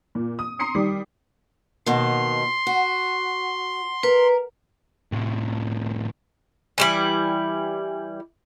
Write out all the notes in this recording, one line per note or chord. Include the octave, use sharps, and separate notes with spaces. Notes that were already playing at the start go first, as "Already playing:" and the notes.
A#2
D#6
A#5 C6 D#6 C7 C#7
D#3 G3 D6
D#2 B2 D#3 C6
F#4
A#4 B4
A2 C3
E3 G3 E4